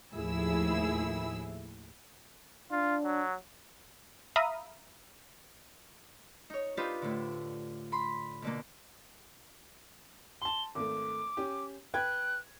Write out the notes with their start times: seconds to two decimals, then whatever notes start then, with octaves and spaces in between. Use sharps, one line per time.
0.14 D#2 A2 F3 E4 G#4 E6
2.71 D4 F4
3.04 F#3
4.36 E5 F5 A#5 B5 D#6
6.50 D#4 C#5
6.77 D4 D#4 F4 G4 B4 C5
7.02 A2 D3
7.92 B5 C6
8.42 B2 D3 A#3
10.42 A5 C6 G7
10.75 G#1 A3 D6
11.37 C#4 G4
11.94 B4 G5 F#6 G#6